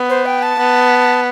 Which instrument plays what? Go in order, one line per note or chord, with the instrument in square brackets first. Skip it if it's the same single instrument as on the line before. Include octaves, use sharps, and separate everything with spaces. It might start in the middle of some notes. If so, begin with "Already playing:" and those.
Already playing: [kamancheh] B3
[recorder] C5
G5
A5
[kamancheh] B3